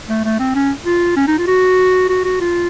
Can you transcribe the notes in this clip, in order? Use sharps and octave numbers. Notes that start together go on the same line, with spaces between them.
A3
A3
C4
C#4
F4
C#4
D#4
F4
F#4
F#4
F#4
F4